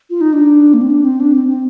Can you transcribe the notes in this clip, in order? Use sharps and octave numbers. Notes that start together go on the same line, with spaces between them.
F4
D#4
D4
A#3
C4
D4
C4
D4
C4
C4